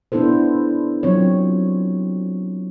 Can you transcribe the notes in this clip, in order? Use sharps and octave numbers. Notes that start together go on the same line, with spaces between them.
B3 D4 E4 A4 C5
F#3 C4 F4 C#5